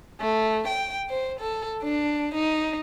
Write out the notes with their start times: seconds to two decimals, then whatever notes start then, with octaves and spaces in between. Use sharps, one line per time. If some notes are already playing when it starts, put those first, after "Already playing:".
0.21 A3
0.68 G5
1.10 C5
1.40 A4
1.83 D4
2.34 D#4